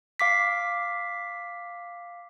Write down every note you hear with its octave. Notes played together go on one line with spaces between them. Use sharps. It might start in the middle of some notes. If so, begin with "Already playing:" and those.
F5 D6 B6